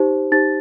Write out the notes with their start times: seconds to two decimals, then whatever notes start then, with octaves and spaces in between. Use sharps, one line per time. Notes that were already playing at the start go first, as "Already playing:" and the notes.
Already playing: D#4 G4 C5
0.32 D#4 G4 C5 A6